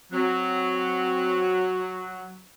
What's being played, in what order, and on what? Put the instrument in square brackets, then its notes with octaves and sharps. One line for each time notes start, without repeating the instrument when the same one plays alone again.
[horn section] F#3 [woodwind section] C4